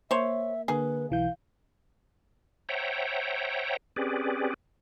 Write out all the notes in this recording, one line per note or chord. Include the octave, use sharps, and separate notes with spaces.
A#3 C5 C#5 E5
D3 A#3 G#4 B4
B1 E3 F5 G6
C5 C#5 E5 F#5 G5 A#5
C4 C#4 G4 G#4 B4 D5